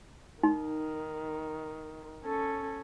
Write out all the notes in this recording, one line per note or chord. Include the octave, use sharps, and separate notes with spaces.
D#3 D#4
C#4 A4